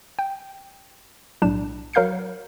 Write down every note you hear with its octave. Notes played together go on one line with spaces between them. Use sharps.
G5
B1 A2 D4 E7
F#3 A#4 F5 G6 C7 C#7